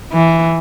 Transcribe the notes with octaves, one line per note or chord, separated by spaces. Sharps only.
E3